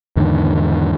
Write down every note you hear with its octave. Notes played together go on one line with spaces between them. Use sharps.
E2 G#2 D3 D#3